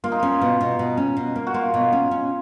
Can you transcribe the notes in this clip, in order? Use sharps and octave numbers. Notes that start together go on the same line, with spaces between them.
A#3 F4
D#4
C#4 F4
B2
B2
B2
C#4
B2
A#3
F#4
A#3 F4
B2
C#4
C#4